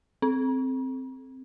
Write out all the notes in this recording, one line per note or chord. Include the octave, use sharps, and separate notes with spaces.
C4